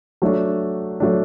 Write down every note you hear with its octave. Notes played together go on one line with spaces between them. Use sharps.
F#3 A3 D4
F#3 A3 D4